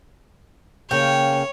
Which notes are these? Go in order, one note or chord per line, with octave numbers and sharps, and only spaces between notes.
C#3 A#3 C#4 C#5 G5